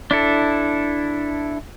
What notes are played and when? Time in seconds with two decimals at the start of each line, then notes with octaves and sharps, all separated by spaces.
0.11 D4 E4 A4